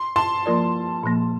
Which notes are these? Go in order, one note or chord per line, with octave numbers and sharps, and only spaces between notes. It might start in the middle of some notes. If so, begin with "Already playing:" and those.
Already playing: C6
A5 C6
F3 A#3 F4 A#4 D5
A#2 F3 A#3